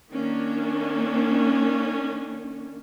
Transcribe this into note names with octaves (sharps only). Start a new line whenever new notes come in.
D#3 A#3 C#4 D4